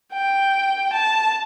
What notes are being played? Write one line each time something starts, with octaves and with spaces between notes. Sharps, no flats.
G5
A5